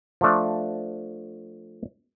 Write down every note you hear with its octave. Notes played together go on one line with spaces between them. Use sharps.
F3 A3 D4